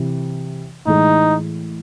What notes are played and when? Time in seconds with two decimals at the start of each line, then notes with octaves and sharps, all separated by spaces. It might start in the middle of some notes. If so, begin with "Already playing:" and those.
Already playing: C3 E3
0.86 A2 E3 G#3 D#4